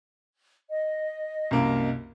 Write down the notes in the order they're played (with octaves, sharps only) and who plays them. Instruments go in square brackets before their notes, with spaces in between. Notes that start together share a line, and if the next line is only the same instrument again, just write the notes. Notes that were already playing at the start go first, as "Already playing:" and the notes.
[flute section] D#5
[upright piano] C2 F#2 A#3